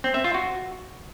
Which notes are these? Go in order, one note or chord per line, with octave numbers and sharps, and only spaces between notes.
C4
E5
F4
F#4